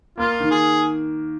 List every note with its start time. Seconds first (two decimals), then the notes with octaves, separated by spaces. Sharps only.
0.18 A#3 F4
0.40 D#3
0.51 G#4